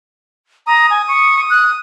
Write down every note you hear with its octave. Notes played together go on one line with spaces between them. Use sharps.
A#5 D#6
G#5
C#6
F#6